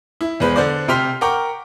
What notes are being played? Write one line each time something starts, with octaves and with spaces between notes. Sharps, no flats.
E4
E2 G#3 B4 C5
D3 C5 D5
C3 G5 C6 F6 B6
A#4 F#5 G5 C#6 D6